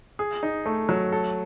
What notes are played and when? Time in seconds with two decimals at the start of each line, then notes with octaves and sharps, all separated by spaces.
0.19 G#4
0.43 D#4
0.66 A3
0.89 F#3
1.12 A4